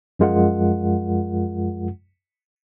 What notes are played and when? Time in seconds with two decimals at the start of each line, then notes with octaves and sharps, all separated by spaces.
0.19 F#2 F3 G#3 F4 A#4 F#5